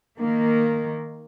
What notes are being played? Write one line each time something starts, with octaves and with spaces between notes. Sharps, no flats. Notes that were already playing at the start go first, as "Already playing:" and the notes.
D#3 A#3